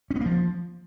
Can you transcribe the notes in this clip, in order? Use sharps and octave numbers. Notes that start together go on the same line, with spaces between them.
C#4
B3
A#3
F3